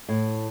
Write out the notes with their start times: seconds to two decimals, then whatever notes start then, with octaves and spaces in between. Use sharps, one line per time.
0.09 A2